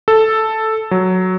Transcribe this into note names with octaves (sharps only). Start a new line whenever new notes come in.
A4
F#3